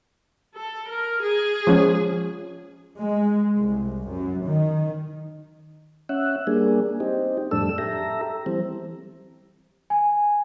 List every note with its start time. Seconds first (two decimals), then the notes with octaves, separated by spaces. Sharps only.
0.55 A4
0.89 A#4
1.22 G#4
1.67 F3 G#3 C#4
2.99 G#3
3.57 C2
4.10 F#2
4.46 D#3
6.09 C#4 E5 F#5
6.47 G3 A#3 D4 G#4
7.00 C4 D#4 G4
7.51 F2 A2 G3 D4 A4 E6
7.78 G4 A4 E5 A#5
8.46 E3 G3 C4
9.90 G#5